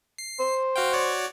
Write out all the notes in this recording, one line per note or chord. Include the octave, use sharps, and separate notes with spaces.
C7
C5
F#4 F5 G5
F#4 C#5 D5